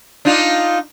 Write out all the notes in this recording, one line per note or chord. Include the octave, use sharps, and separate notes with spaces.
D4 D#4 F4